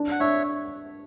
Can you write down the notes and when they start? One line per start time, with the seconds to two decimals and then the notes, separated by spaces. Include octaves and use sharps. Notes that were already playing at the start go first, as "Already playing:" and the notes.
Already playing: D4
0.12 F#5
0.20 D4 C#5 E5